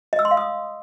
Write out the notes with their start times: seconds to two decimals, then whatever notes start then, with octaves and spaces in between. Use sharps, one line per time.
0.13 D#5
0.19 E6
0.25 C6
0.31 F5
0.37 D#6